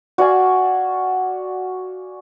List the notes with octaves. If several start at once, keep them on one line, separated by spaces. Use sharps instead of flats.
F#4 D5 F5 G#5